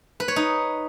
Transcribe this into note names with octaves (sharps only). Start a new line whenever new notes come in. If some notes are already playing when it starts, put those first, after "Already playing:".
B4
C#5
D#4